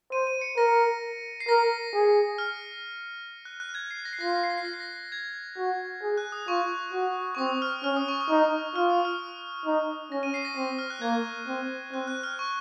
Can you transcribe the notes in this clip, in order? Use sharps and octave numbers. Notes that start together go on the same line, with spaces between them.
C5 D#7
D#7
C#7
A#4 A#6
C7
A#4 A#6
G#4
F6
F#6
F#6
G#6
C7
A#6
C7
F4 A#6
C7
A#6
C7
A#6
C7
A#6
C7
A#6
G#6
F#4
G#4
F#6
D#6
F4 C#6
F#4
C#6
C4 D#6
F6
C#4 F6
D#6
C#6
D#6
D#4
F4 F6
D#6
F6
D#4
C#4 A#6
D#7
C7
A#6
C4
F6
F#6
A#3 G#6
C4
C4 F#6
F#6
F6
C#6